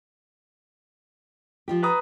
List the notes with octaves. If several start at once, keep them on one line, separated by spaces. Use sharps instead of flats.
F3 F4 G4
B4 A#5 D#6